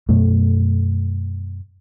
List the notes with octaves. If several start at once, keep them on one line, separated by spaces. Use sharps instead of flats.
F#2 B2 A3